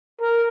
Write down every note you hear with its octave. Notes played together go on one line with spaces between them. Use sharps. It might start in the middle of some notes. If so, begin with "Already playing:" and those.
A#4